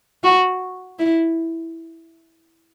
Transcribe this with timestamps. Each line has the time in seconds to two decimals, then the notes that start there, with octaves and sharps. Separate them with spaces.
0.23 F#4
0.99 E4